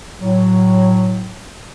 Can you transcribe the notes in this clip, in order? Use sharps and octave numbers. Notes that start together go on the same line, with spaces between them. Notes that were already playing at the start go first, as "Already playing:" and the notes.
A2 F#3